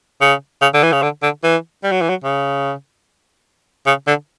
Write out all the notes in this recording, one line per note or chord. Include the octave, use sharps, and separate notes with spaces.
C#3
C#3
D3
E3
C#3
D3
D3
E3
G3
F#3
E3
F#3
C#3
C#3
D3